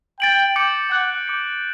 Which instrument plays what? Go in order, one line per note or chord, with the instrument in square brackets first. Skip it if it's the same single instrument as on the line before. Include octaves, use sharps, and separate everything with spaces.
[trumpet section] G5 [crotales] A6 D7 F#7
[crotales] D6 G6 C#7 F#7
[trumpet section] F#5 [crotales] D6 F#6 C#7 F#7
[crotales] D6 G6 C#7